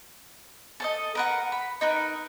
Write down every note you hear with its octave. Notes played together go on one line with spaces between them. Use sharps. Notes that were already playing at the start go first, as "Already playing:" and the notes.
A4 C5 D#5
A#4 B4 F#5
B5
D#4 A#4 B4